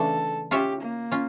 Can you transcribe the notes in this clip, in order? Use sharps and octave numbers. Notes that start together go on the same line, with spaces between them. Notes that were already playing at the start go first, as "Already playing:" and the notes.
Already playing: C#3 E3 A3 D4 A4
C#4 F4 G4 C#5 E5
A#3
C#4 F4